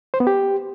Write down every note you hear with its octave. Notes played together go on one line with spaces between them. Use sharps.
C5
B3
G4